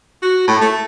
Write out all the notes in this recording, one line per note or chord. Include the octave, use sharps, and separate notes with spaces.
F#4
A2
A3